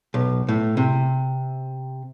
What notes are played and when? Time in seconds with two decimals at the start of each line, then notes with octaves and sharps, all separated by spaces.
0.14 B1
0.49 A2
0.77 C3